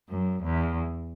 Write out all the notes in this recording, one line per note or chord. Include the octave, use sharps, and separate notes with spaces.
F#2
E2